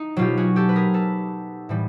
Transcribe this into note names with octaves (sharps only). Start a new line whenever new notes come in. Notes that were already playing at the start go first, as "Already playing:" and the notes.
Already playing: D#4
B2 F#3 F4 G4
F#4 G#4
G4 A4
B4
G#4 A#4
A4 B4
A2 E3 G3